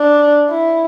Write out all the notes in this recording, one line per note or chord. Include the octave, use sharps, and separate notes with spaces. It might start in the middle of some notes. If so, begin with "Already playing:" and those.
Already playing: D4
E4